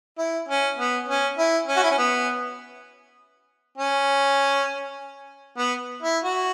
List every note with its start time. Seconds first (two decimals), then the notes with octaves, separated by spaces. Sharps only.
0.18 E4
0.48 C#4
0.78 B3
1.07 C#4
1.38 E4
1.67 C#4
1.76 F#4
1.83 E4
1.91 C#4
1.98 B3
3.78 C#4
5.58 B3
6.03 E4
6.24 F#4